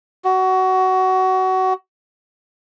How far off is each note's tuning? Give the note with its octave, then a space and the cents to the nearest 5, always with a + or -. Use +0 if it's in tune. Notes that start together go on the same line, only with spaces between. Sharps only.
F#4 +20